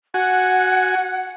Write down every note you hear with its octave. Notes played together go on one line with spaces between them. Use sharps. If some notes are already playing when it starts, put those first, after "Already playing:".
F#4 F#5 G#5